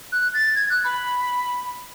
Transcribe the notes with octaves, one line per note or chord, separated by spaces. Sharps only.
F#6
A6
G#6
F#6
B5